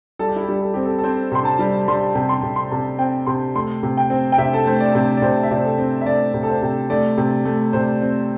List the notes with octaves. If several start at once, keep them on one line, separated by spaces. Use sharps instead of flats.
G3 A4
G4
E4
G4
G3
A4
C4 G4
A4
A4
C4 C5
C3 C6
A5
G3
G3 C6
C3
C6
C3
C6
C3 A5
C4 G5
C3 C6
A3 C6
C3
G5
C4
G5
C3 E5
A4
A3 C5
D5
C3
D5
C3 C5
E5
C3 D5
C5
A4
C4
E5
A3 D5
C3
A4
C5
C3
A3 D5
C3
A3
C3 C5
C4